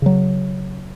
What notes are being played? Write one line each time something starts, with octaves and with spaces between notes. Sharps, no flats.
C#3 F#3